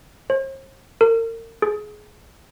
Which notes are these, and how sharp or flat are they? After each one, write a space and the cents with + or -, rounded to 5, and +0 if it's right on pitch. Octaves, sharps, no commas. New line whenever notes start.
C5 +45
A#4 -35
G#4 +20